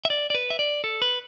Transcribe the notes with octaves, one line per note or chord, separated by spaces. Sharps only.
E5
D5
D5
B4
E5
D5
A4
B4